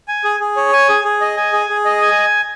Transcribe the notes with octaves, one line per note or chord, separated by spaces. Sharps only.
G#5
G#4
G#4
C#5
G#5
G#4
G#4
D#5
G#5
G#4
G#4
D#5
G#5